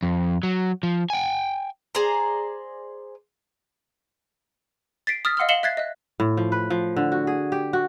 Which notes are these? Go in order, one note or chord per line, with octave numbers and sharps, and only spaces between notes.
F2
F#3
F3
G5 G#5
G#4 C5 D5 A#5
A6 B6 C7 D7
D#6 F6 A6 B6
D#5 F5 F#5 C6 E6 F6
D#5 F5 C#7 E7 F#7 G7
E5 F#6 G#6 A6 C7
D#5 E5 F#6
A2
F3
B4
F3
D3
F#4
G#4
G4
F#4